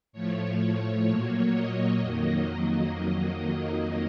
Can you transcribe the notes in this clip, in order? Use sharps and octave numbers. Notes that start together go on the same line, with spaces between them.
A2 F3 A3 C#5
C#5
A#2 F#3 A#3
D#5
F2 D#3 F#3 A#3